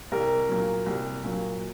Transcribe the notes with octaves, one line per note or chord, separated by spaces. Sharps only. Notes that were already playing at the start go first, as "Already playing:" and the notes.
C2 A#4
A#2 F#3
C2
A#2 F#3